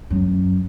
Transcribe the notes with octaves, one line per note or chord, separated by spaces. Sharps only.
F#2